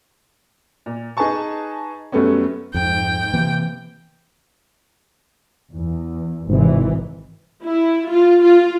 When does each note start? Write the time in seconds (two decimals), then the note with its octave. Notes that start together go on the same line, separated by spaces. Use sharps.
0.86 A#2
1.17 D#4 G#4 B4 G#5 A5 C#6
2.12 F#2 G3 A3 B3 C#4
2.74 F2 G#2 G5
3.34 C3 E3 A#3
5.73 E2
6.50 G#1 G#2 C3 E3
7.65 E4
8.09 F4
8.43 F4